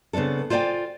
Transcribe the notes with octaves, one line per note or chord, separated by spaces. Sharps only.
C#3 B3 C4 D4 A4
F4 C5 D5 F5 G5 G#5